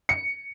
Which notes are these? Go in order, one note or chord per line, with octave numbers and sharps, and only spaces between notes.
C#7